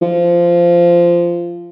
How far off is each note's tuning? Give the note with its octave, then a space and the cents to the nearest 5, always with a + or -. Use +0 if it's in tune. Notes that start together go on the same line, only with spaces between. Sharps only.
F3 -15